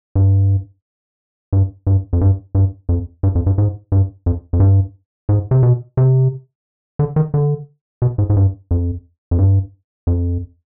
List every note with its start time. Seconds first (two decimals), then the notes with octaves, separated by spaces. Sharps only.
0.15 G2
1.53 G2
1.87 G2
2.13 F2
2.21 G2
2.55 G2
2.89 F2
3.23 G2
3.35 F2
3.46 G2
3.58 G#2
3.92 G2
4.26 F2
4.53 F2
4.60 G2
5.29 G#2
5.51 C3
5.63 B2
5.97 C3
6.99 D3
7.16 D#3
7.34 D3
8.02 B2
8.18 G#2
8.30 G#2
8.36 G2
8.71 F2
9.31 F2
9.38 G2
10.07 F2